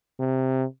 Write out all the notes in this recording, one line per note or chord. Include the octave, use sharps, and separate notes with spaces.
C3